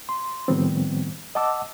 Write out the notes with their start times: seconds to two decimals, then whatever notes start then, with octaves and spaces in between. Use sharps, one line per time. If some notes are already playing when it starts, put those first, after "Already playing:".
0.09 C6
0.48 A2 D#3 F3 G3 B3 C4
1.35 D#5 F#5 A5 D6 E6